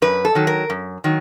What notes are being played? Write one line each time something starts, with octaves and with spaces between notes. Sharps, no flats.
F#2 B4
A4
D#3 F#3
A#4
F#2
D#3 F#3